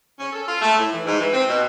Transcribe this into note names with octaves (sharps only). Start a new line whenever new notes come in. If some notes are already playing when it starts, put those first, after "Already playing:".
C#4
A4
F4
A3
A2
E3
G#2
E3
C4
B2